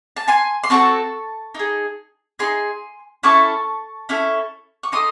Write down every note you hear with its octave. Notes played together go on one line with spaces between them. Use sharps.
A5
G#5 C6
C6
C4 F#4 A4 A5 C#6
D#4 G#4
D#4 G#4 G#5 C6
C#4 E4 A4 A5 C#6
C#4 E4 A4
C#6
D#4 A4 C6 D#6